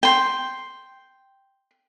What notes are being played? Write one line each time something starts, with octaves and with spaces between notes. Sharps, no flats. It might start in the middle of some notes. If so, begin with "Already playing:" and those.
G5 C6